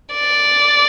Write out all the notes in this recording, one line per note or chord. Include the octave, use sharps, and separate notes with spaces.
D5